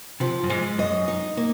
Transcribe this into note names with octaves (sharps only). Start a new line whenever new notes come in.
C3 F3
F#2
G#2 G#3
F#2 D#5
D#4
A#3